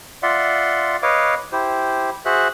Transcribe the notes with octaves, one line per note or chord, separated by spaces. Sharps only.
F4 D5 E5 F#5 C6
B4 C#5 D#5 F5 D6
E4 G4 C5
F#4 G#4 C5 E5 F#6